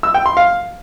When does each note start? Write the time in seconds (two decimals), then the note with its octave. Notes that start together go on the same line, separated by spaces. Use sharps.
0.03 E6
0.14 G5
0.26 C6
0.37 F5